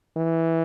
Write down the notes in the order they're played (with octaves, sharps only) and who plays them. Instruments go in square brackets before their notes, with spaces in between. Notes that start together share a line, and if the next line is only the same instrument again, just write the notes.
[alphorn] E3